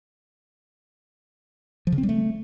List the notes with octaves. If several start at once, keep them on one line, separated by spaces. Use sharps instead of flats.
F3
C#3
C4
G3
A3